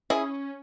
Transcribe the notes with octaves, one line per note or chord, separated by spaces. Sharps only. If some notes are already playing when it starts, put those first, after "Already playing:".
C#4 E4 G#4